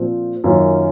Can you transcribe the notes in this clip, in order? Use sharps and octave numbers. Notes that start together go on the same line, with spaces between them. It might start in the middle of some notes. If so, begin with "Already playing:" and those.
Already playing: A#2 F3 C4 F4
F#2 D#3 A#3 C#4 F4